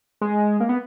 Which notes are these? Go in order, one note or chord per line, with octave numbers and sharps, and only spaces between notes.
G#3
A#3
B3